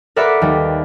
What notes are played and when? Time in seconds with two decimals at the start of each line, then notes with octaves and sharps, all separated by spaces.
0.16 A#4 B4 D5 E5 F#5 B5
0.41 D#2 G3